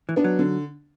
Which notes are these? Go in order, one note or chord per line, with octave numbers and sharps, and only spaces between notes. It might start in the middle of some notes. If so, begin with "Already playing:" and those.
E3
B3 D4
F#3
D3